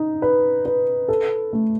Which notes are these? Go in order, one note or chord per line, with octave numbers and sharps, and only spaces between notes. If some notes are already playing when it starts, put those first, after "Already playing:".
Already playing: D#4
B4
B4
A4
A3